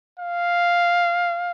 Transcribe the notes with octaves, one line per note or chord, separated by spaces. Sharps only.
F5